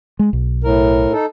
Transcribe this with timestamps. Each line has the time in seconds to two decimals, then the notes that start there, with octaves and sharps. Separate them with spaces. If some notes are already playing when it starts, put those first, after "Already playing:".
0.19 G#3
0.33 B1
0.64 A2 A#4
1.13 D#4 A4